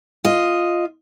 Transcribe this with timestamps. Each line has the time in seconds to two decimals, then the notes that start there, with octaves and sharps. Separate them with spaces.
0.25 F4 D#5